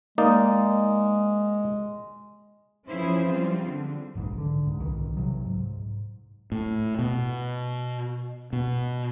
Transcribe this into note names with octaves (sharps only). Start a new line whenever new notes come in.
G#3 A#3 D#4 D5
E3 F3 C#4 E4 G#4 C5
F3 G3 C4 F4
D3
F#1 B1 G#2 E3
D3
C#2 G#2
B1 D#3 E3
C2 C3 F#3
G#2
A2
B2
B2